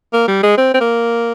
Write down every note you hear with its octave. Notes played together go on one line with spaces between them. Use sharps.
A#3
G3
G#3
C4
C4
A#3